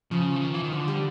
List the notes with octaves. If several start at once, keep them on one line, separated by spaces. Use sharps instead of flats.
C#3 F3
E3
D#3
E3
D#3
D3 F3
G3